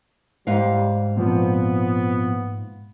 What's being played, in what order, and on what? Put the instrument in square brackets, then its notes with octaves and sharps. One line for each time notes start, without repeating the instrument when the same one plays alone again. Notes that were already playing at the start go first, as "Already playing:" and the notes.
[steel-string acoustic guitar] G#2 F5 [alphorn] G3
[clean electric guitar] A#2 F3 C4 [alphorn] B3